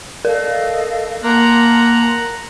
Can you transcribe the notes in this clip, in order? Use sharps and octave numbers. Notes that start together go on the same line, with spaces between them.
A4 A#4 D#5 F5
A#3 F#5 A5 A#5 C6